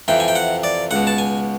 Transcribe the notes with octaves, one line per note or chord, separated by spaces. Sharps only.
F2 C3 E3 G5
G#5
G5
F#5
D5
C#2 B2 F#5
A5
G#5